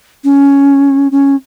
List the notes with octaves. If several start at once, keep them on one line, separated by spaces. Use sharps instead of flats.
C#4
C#4